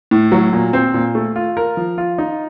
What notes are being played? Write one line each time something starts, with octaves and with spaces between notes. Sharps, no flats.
A2
F#3
A#2
C4
A#2
A3
F4
A#4
F3
F4
D#4